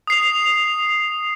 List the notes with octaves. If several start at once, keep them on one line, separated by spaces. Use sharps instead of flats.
D#6 C7 F7